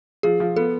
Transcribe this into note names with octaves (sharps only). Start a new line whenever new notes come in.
F3 G#4
F3
B3 A4